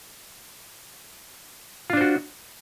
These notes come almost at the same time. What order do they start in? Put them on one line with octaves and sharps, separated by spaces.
F4 D4 C5 F#4